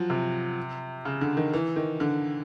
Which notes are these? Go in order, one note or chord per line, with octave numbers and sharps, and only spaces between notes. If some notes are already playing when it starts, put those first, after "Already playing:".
Already playing: F3 F#3
C3
C#3
D3
D#3
E3
D#3
D3